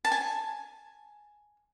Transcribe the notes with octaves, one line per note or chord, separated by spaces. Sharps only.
A5
G#5